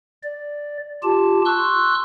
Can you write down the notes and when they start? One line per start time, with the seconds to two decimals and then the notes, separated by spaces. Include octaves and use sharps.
0.23 D5
1.03 F4 G4 A5
1.46 C6 C#6 E6 F#6